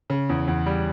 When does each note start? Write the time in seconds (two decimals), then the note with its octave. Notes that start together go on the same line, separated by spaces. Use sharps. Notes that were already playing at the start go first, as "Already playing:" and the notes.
0.10 C#3
0.29 E2
0.48 E2
0.66 G3